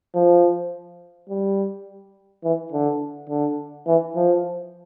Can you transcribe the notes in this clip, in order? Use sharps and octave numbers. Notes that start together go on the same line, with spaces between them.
F3
G3
E3
D3
D3
E3
F3